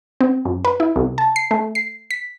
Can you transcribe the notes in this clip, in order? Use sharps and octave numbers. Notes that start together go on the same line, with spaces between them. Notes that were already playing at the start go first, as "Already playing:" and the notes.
C4
F#2
B4
E4
C2
A5
C7
A3
C7
B6